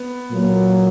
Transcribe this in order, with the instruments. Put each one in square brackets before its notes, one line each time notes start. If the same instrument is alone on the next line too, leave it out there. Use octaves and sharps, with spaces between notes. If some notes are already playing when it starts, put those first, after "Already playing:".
Already playing: [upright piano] B3
[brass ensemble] A#2 F#3 A#3